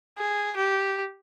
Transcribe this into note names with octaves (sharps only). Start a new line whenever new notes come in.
G#4
G4